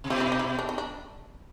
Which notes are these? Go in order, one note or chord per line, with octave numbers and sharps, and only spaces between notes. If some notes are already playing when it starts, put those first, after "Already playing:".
C3
B2 F4
E4
D#4
E4
D4
D#4
D4